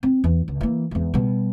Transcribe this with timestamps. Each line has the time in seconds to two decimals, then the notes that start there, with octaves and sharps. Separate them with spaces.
0.03 C4
0.24 E2
0.48 C#2
0.61 E3 A#3
0.91 E2 G#2
1.14 B2 G3